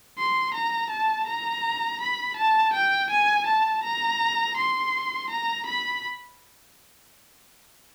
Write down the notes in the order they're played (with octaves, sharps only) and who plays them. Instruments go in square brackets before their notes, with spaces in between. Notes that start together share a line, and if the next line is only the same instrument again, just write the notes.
[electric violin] C6
A#5
A5
A#5
B5
A5
G5
G#5
A5
A#5
C6
A#5
B5